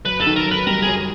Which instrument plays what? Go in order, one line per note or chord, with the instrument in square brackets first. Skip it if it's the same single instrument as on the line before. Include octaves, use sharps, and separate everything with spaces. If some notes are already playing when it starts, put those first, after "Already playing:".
[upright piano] F#2 [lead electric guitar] B4
[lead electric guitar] A4
[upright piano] D#3
[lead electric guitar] A#4
[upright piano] F#2
[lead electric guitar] B4
[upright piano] G3 [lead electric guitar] A#4
[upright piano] F#2 [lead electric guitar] G#4